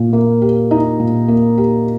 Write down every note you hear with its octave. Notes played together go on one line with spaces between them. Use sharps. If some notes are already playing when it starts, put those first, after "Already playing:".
Already playing: A#2
A#3
G4
D#4
A#2
A#3
G4